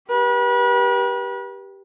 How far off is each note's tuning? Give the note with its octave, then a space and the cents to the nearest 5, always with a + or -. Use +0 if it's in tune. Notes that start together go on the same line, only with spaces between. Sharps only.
G4 +0 B4 -35